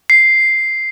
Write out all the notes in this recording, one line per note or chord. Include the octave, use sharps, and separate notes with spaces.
C7